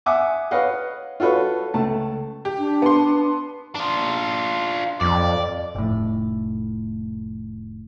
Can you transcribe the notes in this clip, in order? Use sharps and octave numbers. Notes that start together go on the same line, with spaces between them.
E5 F#5 G#5 D6 D#6
B4 C#5 D#5 F5 F#5
F4 F#4 A4 B4 C#5
C#2 A3 A5
G4
D4
B3 C6
D4 F4
F2 D5
F1 A2